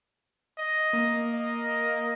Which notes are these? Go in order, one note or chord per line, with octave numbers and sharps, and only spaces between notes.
D#5
A#3
D#5